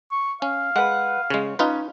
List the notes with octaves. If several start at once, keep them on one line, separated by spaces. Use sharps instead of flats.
C#6
C#4 F5
G#3 B4 F#5
C#3 G#3 C#5
C#4 D#4 F4 B4